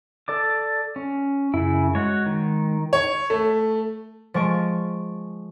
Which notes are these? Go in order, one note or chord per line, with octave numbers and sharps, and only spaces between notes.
A4 D5 D6
C#4
F#2 C#3 E4
G#3 F#4 C#5
D#3
C#5
A3
F3 G#3 C#6 D7